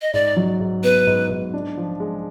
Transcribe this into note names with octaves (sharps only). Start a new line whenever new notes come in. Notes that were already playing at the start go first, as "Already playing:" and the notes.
D#5
G#2 D5
F#3
G#2
B3 B4
G#2
G#2
D4
F3
G#3